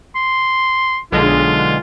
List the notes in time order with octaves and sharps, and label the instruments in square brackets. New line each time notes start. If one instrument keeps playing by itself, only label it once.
[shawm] C6
[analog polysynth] B1 D3 G#3 [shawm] F4